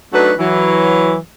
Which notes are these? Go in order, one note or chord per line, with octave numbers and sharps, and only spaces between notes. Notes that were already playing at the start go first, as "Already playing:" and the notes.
F#3 A3 D4 D#4 F#4 B4
E3 F#3